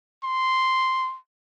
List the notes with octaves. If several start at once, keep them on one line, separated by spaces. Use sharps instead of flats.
C6